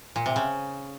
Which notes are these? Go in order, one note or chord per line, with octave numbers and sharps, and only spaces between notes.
A#2
C3
C#3